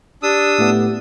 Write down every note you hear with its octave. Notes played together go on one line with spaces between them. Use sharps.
D4 G4 D#6 E6
A2 A3 B3